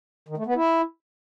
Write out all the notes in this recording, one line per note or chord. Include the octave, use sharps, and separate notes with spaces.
D#3
A3
B3
E4